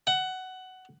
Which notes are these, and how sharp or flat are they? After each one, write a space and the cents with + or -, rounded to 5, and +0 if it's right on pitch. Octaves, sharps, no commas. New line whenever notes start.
F#5 +15